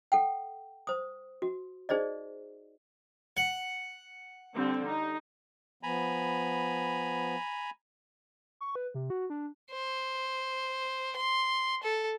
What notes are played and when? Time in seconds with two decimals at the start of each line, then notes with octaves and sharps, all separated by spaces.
0.12 A4 F#5 G5
0.87 C5 D#6
1.42 F#4
1.89 D#4 G#4 C5 D5 D#5
3.37 F#5
4.54 D3 G3 C4
4.87 D#4
5.83 F3 B3 G#5 A#5 B5
8.61 C#6
8.75 B4
8.95 C3
9.10 F#4
9.30 D4
9.72 C5
11.16 C6
11.83 A4